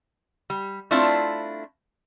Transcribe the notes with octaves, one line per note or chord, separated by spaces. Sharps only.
G3
A3 C4 D4 E4 F4